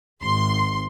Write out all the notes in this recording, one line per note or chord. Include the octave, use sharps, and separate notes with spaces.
G#1 C6